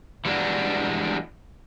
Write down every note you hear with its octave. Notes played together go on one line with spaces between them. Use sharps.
E3 G3 G#3 D4 F#4